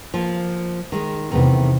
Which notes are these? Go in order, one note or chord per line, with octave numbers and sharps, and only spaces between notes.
F3 A#3
D#3 G#3
E2 C3 D#3 A3 B3